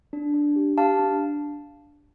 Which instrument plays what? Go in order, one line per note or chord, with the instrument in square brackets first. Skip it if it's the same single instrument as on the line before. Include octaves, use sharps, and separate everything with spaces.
[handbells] D4
D4
G4
G4 F5 A5
D4